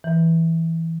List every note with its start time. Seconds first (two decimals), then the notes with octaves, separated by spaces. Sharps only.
0.04 E3